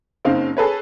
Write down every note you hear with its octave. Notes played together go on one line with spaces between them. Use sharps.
F#1 C#3 C4 D#4 F5
G#4 A4 B4 C#5